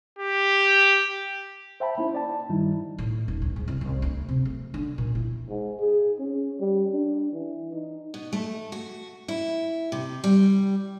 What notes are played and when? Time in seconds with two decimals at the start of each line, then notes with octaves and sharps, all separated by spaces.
0.19 G4
1.80 C5 E5 G5 A5 B5
1.98 A#3 C#4 D#4 E4 C5
2.14 D5 A5
2.49 G2 D#3 G3 D#4 E4
2.98 A2
3.28 D#1
3.42 D2
3.56 G#2
3.68 C2
3.81 C2
4.02 D2
4.28 C3
4.45 A3
4.74 D3
4.98 A#2
5.15 E4
5.49 G#2
5.79 G#4
6.19 C#4
6.60 G3
6.92 D4
7.32 E3
7.72 D#4
8.14 B2
8.33 A3
8.72 F#4
9.28 E4
9.92 C3
10.24 G3